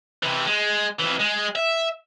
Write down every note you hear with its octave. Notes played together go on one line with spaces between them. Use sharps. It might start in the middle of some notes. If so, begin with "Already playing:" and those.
C3 E3
G#3
F2 E3
G#3
E5